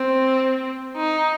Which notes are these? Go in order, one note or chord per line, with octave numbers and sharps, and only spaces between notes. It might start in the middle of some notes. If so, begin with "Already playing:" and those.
Already playing: C4
D#4